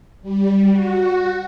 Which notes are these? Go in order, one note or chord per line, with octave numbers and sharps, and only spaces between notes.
G3
F#4